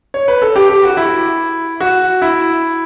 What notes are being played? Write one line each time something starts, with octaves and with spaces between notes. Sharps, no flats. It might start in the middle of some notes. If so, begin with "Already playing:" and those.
C#5
B4
A4
G4
G4
F#4
E4
F#4
E4